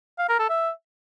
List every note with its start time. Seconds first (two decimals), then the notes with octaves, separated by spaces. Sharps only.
0.19 F5
0.29 A#4
0.39 A4
0.49 E5